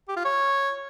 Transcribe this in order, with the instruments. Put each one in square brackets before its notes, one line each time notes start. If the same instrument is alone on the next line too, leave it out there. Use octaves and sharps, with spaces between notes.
[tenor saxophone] G4
F4
C#5